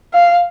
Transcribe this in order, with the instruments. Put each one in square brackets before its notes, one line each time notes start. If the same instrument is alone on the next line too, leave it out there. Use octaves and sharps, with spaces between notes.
[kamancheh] F5